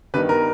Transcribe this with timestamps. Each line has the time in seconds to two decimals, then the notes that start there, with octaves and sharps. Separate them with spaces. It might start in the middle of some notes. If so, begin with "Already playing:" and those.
0.14 G2 D#3 G3 B3 D4 B4
0.29 A#4